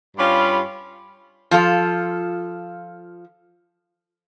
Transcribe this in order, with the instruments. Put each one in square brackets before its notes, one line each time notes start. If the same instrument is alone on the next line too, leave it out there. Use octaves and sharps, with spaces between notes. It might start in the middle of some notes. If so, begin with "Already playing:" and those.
[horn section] G2 G3 C#4 F4 F5 B5
[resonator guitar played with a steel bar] F3 F4 A4